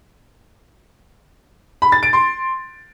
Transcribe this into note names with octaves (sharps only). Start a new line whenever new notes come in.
B5
A6
D7
C6